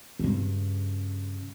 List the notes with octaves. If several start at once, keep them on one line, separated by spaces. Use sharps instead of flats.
G2 C#3